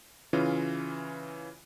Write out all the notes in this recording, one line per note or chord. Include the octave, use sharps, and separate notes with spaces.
C#3 E3 C#4 F4